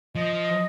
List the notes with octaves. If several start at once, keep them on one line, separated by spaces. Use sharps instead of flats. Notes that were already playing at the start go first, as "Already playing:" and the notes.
F3 D#5